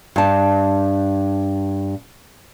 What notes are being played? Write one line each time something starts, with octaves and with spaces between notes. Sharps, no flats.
G2 A5